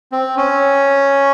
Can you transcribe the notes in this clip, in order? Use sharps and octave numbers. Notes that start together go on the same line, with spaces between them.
C4
C#4